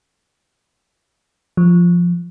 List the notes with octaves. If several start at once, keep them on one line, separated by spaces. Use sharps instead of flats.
F3